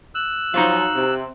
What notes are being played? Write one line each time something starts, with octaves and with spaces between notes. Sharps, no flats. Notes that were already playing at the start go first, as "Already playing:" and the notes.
E6 F#6
F3 F#3 D#4 F#4 F5
C3